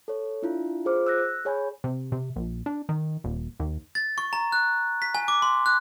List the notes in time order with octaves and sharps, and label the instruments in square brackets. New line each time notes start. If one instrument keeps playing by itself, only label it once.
[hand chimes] A4 C#5
D4 E4 F4
F4 G#4 C5 D6 F6
E6 F#6 A#6
G#4 C#5 G#5 B5 G6
[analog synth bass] C3
C3
A#1
D4
D#3
D#1
D#2
[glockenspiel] A6
C#6
A#5
F#6
B6
G#5
D6
C6
F#6